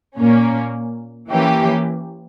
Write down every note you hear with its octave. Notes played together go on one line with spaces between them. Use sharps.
A#2 A#3 C#4
E3 A#3 C#4 G4